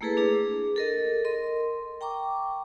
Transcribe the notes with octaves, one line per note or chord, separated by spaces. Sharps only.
A3 A#3 E4 G#4 A4 B4
D4 G#4
A4 A#4 D#5
A#4 D#5 C6
G5 A#5 C#6 D6